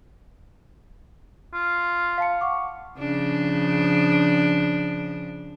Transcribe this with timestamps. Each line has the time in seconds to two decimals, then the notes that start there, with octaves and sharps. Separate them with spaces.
1.54 F4
2.18 F5 A5 C#7
2.41 F#5 C#6 D6
2.98 C#3 F3 D4